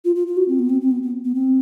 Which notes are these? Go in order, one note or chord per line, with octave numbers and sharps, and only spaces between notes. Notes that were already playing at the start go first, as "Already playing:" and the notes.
F4
F4
F4
F#4
C4
B3
C4
C4
B3
B3
B3
C4